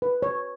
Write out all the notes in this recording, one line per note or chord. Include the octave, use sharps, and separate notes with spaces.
B4
C#5